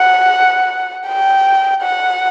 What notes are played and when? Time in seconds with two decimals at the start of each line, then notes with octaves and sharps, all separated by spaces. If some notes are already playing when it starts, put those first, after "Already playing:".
Already playing: F#5
1.07 G5
1.82 F#5